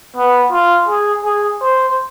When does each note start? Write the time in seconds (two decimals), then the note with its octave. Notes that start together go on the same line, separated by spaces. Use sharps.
0.16 B3
0.52 F4
0.88 G#4
1.25 G#4
1.62 C5